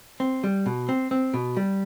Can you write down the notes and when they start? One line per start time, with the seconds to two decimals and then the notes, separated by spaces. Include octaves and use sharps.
0.20 C4
0.44 G3
0.66 B2
0.89 C4
1.11 C4
1.34 B2
1.57 G3